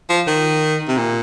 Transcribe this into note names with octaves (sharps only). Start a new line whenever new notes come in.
F3
D#3
C3
A#2